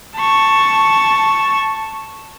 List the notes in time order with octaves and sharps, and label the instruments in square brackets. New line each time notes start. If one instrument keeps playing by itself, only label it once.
[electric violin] A5 C#6